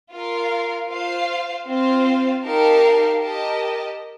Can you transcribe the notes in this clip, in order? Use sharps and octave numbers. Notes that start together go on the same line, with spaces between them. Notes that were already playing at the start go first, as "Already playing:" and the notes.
F4 A#4 F5
F4 C5 F5
C4 F4 C5 F5
D#4 G4 A#4 F5 A5
G4 A#4 D#5 A5